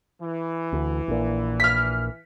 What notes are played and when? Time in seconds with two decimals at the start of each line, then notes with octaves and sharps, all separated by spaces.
0.20 E3
0.73 D2
1.08 A#1 A#2
1.60 F6 B6